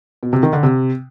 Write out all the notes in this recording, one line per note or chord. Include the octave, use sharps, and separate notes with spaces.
B2
C3
D#3
D3
C3